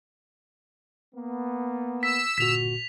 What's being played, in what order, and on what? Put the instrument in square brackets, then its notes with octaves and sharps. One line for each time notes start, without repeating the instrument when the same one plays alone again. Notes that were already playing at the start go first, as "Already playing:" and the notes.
[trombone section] A#3 B3
[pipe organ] E6 [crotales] B6
[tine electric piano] G1 A#2 F#4 [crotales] B6 F7